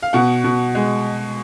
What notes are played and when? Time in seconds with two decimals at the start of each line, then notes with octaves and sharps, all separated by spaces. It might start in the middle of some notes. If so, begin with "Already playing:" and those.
0.02 F5
0.13 B2 F#5
0.44 B2
0.75 G#3